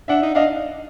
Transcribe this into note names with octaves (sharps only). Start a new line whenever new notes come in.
D4 E5 F#5
D#4
D4 D#5 F5